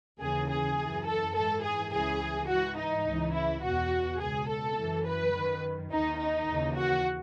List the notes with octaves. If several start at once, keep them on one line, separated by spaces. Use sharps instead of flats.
D#2 C#3 E3 G#4
G#4
F#2 E3
A4
G#2 E3 A4
G#4
C#2 C#3 E3 G#4
G#2 E3 F#4
D#4
C#2 C#3 E3
E4
E2 B2 F#4
C#2 B2 G#4
A4
F#2 E3
B4
F#2 D#3
D#2 D#3 D#4
D#4
D#2 C#3 E3
F#4